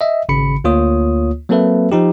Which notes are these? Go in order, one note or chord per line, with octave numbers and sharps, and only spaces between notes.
D#5 E5
G#1 C#3 B5 C#7
D2 A#3 F4 C#5 D#6
F#3 A#3 C4 A4 B4 E5
F3 D#4 G4